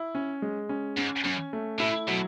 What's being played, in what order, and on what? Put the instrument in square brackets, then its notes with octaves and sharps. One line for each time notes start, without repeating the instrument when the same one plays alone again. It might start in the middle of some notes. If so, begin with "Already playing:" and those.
Already playing: [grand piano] E4
C#4
G#3
C#4
[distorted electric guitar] G#2 [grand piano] C#4
[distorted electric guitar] F#2 [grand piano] C#4
[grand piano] A3
[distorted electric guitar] A2 [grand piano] E4
[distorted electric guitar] B2 [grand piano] F#3